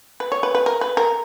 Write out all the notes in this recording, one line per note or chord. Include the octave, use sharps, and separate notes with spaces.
B4
C#5
B4
B4
A#4
B4
A#4